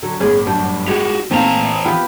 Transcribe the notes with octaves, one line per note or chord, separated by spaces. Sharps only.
D3 F#3
G1 A2 C#4 G#4
F#2 G3 D4
G#3 F#4 G4
A#2 E3 A3 C4 F5 A5 A#5
B3 F4 G4 B4